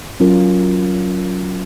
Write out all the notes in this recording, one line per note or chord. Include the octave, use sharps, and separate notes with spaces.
F#3 C#4 F4 A#4